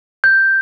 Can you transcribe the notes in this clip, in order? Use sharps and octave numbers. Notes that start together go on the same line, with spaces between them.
G6